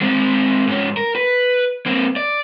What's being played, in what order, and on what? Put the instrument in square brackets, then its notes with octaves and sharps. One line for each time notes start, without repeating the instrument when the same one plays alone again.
[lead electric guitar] G#3 C4
G#2 C#4
A#4
B4
A#3 C4
D5